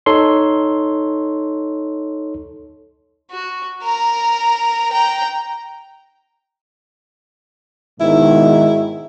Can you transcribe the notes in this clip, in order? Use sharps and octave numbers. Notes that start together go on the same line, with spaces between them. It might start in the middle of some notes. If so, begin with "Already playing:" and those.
D#4 A4 C#5 C6
F#4
A#4 A#5
G5 A#5
G#2 B2 D#3 E4